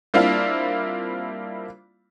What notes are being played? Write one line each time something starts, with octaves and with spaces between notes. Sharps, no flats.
G3 A#3 C4 D4 E4 F4